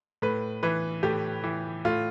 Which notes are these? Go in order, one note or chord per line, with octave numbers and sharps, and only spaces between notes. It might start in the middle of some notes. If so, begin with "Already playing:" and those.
A2 B4
E3 B4
A2 G4
E3
A2 F4